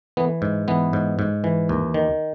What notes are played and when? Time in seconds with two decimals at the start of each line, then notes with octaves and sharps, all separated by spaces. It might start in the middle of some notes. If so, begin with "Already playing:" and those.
0.17 E3 B3
0.42 G#2
0.68 E3 B3
0.93 G#2
1.19 G#2
1.44 E3
1.69 D#2
1.94 D#3